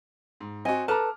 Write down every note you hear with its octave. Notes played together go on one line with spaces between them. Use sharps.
G#2
C4 F#4 D#5 G#5
A4 B4 A5 A#5 D6 F6